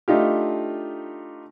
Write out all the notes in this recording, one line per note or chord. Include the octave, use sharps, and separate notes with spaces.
A3 D4 D#4 F4 G4